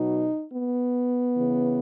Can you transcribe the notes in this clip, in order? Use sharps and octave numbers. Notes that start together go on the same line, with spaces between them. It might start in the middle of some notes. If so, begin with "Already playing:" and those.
Already playing: B2 F#3 D#4
B3
C#3 E3